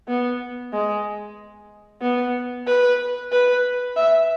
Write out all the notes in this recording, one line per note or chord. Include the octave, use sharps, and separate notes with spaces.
B3
G#3
B3
B4
B4
E5